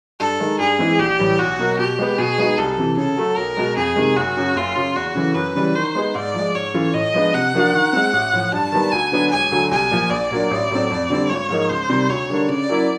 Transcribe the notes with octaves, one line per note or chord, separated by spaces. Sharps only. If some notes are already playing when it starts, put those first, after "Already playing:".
G2 A4
D#3 G#3
G2 G#4
E3 G#3 C4 E4
A#1 G4
A2 E3 G3
B1 F#4
B2 F#3 A#3
B2 G4
G#3 B3
B2 G#4
G#3 B3 D#4 F#4
C2 A4
C3 E3
C#3 A4
F#3 A3
B1 A#4
B2 G#3
F2 G#4
C3 D#3 G#3
F#1 F#4
F#2 C#3
F#1 F4
F#2 C#3
E2 F#4
C#3 E3 A3
F#2 B4
C#3 E3 G3
D#3 C5
G#3 B3 D#4 G#4
G#2 D5
F3 G#3
G#2 C#5
E3 A3 C#4 F4
A2 D#5
F3 G#3 B3 D4
C3 F#5
F3 A#3 D4 F#4
D#3
G#3 C4
A1
A2 F3
G2 A5
D#3 G3 B3
D2 G#5
D3 F#3 B3 D4
E1 G#5
D2 D3 F#3 A3
C2 G#5
A#2 F3
A#1 D5
A#2 F#3 A#3 D4
A1
A2 F#3 A3 C4
F2
D3 G3 C4
G#1 C#5
G#2 F3 A#3 D#4
C#2 C5
C3 D#3 G3
D2 C#5
D3 G3 A#3 D4
C#3 D5
F#3 A#3 C#4 E4